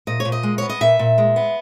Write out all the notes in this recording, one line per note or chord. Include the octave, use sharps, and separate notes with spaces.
A#2 D#5
C#5
A#2
D#5
G#3
B3 C#5
D#5
A#2 E5
A#2
G#3
B3